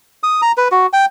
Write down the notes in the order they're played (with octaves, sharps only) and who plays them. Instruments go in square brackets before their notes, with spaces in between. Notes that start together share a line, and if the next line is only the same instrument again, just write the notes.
[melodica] D#6
A#5
B4
F#4
G5